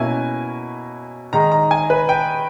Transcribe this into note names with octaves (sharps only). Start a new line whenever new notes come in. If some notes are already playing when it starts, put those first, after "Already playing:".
Already playing: B2 A#3 C#4 E4 G#5
D#3 G#3 D#4 A#5
A#5
G#5
B4
G5